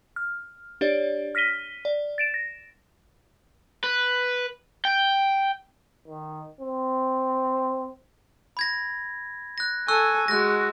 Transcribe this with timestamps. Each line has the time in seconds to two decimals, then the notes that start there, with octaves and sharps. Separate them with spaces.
0.16 F6
0.81 D4 G4 C#5 D5
1.35 F6 A#6 B6 D#7 G7
1.85 D5
2.18 A6 D7 E7
2.34 A#6
3.84 B4
4.85 G5
6.08 D#3
6.61 C4
8.57 B5 G#6 A#6
9.58 F#6 A#6
9.88 A4 G#5 C#6 E6 F#6
10.28 G#3 F#4 F#6 A#6